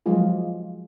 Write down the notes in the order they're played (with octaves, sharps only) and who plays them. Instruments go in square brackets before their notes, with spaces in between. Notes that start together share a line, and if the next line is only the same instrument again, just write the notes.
[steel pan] F3 F#3 G#3 F4 G#4